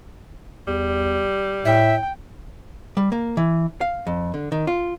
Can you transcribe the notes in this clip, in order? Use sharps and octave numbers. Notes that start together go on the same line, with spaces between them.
E2 G3
A2 E5 G5
G3
A#3
E3
F5
F2
D3
D#3
F4